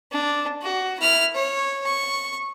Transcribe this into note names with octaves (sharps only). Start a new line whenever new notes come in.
D4
F#4
E4 F6
C#5
C#6